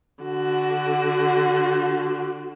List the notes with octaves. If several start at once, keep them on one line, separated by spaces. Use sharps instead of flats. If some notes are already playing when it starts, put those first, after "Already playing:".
D3 F#4